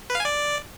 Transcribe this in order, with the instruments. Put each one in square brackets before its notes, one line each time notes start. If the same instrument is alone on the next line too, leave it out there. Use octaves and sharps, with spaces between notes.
[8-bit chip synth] B4
F5
G#5
D5